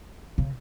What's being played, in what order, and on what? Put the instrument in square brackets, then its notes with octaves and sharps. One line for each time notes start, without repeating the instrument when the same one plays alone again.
[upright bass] C#3